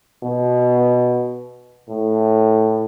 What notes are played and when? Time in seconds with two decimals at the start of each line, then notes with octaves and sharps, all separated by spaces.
0.23 B2
1.89 A2